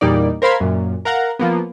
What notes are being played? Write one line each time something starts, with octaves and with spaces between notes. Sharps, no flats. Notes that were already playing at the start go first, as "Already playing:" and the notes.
E2 A#2 G3 A#3 D#4 D5
A#4 C5 F5 B5 C6 G#6
F#2 A#2
A#4 F5 F#5 A#5
F3 A#3 B3